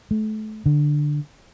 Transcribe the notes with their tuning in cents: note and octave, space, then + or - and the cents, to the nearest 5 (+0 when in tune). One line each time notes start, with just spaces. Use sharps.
A3 -30
D3 +10